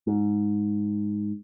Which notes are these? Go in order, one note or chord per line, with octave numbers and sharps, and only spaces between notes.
G#2